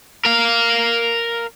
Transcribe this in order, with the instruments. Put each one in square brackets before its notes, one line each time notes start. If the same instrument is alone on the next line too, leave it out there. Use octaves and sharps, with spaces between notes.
[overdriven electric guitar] A#4 F5